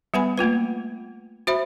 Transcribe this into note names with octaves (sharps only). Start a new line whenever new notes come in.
G3 B3 B4 F#5 G#5 B5
A3 A#3 F4 B4
F#4 C5 E5 B5